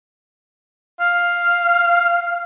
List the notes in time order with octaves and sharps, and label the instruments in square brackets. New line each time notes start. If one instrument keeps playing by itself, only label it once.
[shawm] F5